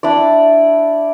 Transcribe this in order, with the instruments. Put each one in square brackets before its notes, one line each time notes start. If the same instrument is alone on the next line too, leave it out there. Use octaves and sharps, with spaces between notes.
[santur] D4 E4 D5